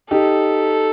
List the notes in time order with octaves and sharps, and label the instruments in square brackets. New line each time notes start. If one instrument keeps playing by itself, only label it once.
[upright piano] D#4 G4 [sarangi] A4